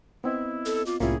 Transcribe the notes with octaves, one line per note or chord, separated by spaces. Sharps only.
B3 C4 E4 D#5
A4
F4 D6
C2 A2 C3 A#3 C#4 E4 F4 G#4